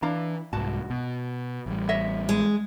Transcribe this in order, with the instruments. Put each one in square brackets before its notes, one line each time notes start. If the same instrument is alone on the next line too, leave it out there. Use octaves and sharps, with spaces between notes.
[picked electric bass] E3 [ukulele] D4 F5 A#5
[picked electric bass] C2 G#2 [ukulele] F#4 A5
[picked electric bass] B2
A1 G3
[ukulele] C#5 D#5 E5
[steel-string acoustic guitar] G#3